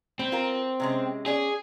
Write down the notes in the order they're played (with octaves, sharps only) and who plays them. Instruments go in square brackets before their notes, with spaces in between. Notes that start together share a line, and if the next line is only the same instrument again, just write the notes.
[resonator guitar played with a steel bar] G3 [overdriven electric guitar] C4
[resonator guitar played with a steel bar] F4 A#4
C3 G#3 C#4
[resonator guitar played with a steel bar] C#4 D5 [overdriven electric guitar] G#4